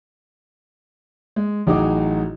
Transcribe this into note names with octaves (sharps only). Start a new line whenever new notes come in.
G#3
A1 F#3 D#4 F#4 G#4 D6